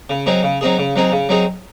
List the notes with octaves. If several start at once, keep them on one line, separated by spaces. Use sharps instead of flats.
C#3
F#3 C4 D#4 G#4
C#3
F#3 C4 D#4 G#4
C#3
F#3 C4 D#4 G#4
C#3
F#3 C4 D#4 G#4